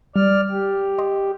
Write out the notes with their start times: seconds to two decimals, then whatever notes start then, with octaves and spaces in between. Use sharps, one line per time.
0.16 G3 D5 F6
0.51 G4
0.98 D#5 C6